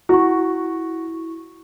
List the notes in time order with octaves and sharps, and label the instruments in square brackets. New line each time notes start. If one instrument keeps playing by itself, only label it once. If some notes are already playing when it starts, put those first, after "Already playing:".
[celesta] E4 C#6 [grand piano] F#4